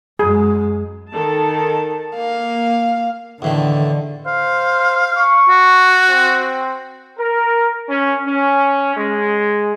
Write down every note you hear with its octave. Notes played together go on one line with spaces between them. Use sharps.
F#2 G#3 G#4
D#3 A4 A5
A#3 F5
E2 A2 D3 D#3
C5 F5
C#6
F#4
C4
A#4
C#4
C#4
G#3